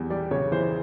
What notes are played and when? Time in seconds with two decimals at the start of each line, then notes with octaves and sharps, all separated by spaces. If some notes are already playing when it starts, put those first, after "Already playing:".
Already playing: E2 G3
0.10 G3 D5
0.31 C#3 C#5
0.52 E3 C5